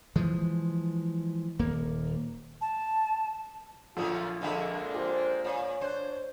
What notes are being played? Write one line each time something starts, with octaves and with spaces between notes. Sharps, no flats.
E3 F3 G#3
D#1 A#3
A5
A#1 F#2 D3 F3 F4
F2 D3 G#3 A#3 D4 E5
F4 G4 A4 C5
A#2 C#5
D4 C5 F#6